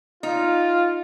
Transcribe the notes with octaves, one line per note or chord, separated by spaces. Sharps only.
D#4 F4